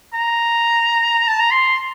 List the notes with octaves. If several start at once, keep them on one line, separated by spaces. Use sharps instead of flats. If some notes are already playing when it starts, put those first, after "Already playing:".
A#5
A5
A#5
C6